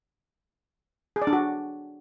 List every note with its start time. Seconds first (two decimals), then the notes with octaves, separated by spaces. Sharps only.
1.16 G#4
1.22 D5
1.27 D4
1.33 F#4